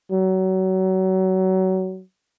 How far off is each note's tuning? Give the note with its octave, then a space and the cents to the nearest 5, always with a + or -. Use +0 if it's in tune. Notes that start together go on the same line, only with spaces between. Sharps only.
F#3 +25